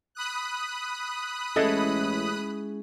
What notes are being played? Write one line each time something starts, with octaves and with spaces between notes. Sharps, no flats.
B5 D#6 F#6
A1 G#3 C#4 E4 G#4 A4 D#5